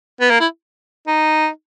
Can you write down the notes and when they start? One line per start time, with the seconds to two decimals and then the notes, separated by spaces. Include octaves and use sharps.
0.21 B3
0.30 A#3
0.40 E4
1.07 D#4